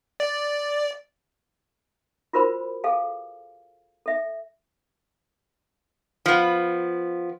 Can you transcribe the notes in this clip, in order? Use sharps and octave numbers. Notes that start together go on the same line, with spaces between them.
D5
F4 F#4 A#4 C5 B5
G#4 A4 F5 G#5
A4 E5
F3 B3